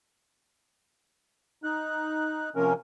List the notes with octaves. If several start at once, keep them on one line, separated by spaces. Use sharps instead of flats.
D#4 F#6
C3 F3 A#3 C#4 A#4